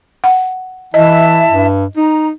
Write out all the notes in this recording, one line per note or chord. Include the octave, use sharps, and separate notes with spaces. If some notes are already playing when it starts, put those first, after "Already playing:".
F#5
E3 E4 D#5 E5 A5
G2
D#4 A#5